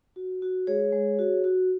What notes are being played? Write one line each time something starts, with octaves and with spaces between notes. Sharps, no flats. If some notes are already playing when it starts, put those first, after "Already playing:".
F#4
F#4
G#3 G#4 C#5
G#3
F#4
F#4